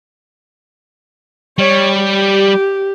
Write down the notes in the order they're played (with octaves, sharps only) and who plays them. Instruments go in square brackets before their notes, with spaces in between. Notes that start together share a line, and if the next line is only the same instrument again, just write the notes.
[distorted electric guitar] G3 [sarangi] C#5
[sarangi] G4